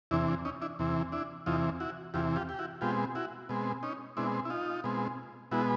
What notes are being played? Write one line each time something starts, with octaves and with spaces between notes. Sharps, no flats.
E2 C3 E3 D4 E4
D4
C#4 D#4
D4 E4
E2 C3 E3
D4 E4
E2 C3 E3 D#4 F4
E4 F#4
E2 C3 E3 F4 G4
F4 G4
G4
E4 F#4
B2 G#3 C4 F4 G4
E4 F#4
B2 G#3 C4
C#4 D#4
B2 G#3 C4 D4 E4
E4
D#4 F4
B2 G#3 C4
B2 G#3 B3 E4 F#4